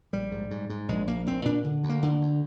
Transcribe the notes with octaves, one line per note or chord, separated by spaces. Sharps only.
A#1 G3
G#2
G#2
G#2
A#1 G#3
A#1 A#3
A#1 C4
A#2 D4
D3
D2
A#3
D3
D2